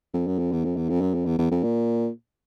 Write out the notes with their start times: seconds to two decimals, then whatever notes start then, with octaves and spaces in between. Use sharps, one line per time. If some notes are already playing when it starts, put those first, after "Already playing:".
0.14 F2
0.27 F#2
0.39 F2
0.52 E2
0.64 F2
0.76 E2
0.89 F2
1.01 F#2
1.14 F2
1.26 E2
1.39 E2
1.51 F2
1.63 A#2